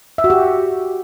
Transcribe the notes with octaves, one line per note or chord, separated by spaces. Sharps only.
E5
F#4
G4